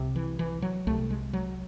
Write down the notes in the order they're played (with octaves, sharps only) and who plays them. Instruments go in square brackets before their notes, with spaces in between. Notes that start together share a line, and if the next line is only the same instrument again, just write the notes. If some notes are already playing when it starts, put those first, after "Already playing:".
Already playing: [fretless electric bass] C2 C3
E3
E3
F#3
C2 C3 A3
G#3
F#3